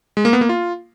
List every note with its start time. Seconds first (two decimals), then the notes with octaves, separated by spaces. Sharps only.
0.17 G#3
0.25 A#3
0.33 B3
0.41 A#3
0.49 F4